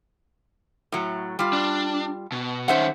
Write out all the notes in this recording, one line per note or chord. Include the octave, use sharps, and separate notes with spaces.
A2 F#3
G3 F4
D4
B2
D#3 C#4 C5 E5 F#5